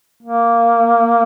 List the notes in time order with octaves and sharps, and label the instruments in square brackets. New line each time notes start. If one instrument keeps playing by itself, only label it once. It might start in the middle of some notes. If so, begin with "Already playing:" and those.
[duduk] A#3